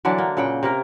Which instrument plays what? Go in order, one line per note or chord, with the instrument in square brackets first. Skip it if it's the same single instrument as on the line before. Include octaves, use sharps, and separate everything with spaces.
[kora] D3 E3 F#3 D4
A#3
A#2 C#3 F#5 G5
C3 A#3 A#4